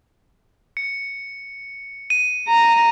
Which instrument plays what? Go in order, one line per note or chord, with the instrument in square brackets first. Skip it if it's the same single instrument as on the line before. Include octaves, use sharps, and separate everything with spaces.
[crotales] C#7
D#7
[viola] A#5